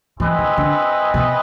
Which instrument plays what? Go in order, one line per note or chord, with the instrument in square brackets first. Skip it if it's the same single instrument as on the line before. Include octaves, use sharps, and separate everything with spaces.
[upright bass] E3 [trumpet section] C4 E4 G#4 B4 D#5
[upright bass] D#3
D3
B2